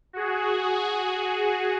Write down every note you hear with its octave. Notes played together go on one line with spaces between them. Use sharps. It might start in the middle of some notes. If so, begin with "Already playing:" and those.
F#4 G#4